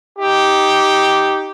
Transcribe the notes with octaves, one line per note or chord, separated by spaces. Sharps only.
D#4 G4